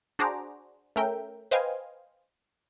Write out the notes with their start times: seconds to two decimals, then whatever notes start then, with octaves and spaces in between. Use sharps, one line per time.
0.19 D4 F#4 G#4 C5 A#5 D6
0.96 A3 C#4 A#4 E5 G5
1.51 B4 C5 D#5 F5 G5 G#5